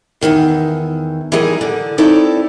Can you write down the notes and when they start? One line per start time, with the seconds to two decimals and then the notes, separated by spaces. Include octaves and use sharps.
0.21 E2 A2 D#3 E3
1.32 E3 F#3 G3 D#4 G#4 A#4
1.61 D3
1.98 C4 D#4 E4 A4 C#5 D5